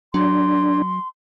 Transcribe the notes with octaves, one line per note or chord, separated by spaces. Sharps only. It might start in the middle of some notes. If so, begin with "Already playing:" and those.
F#3 D4 C6